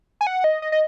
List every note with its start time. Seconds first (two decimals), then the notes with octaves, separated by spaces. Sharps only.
0.21 G#5
0.27 F#5
0.44 D#5
0.62 D#5
0.72 D#5